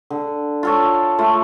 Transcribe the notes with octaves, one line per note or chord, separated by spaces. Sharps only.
D3
F4 A4 C#5
A3 F4